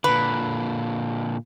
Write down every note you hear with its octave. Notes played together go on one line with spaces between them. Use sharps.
A#2 D3 B4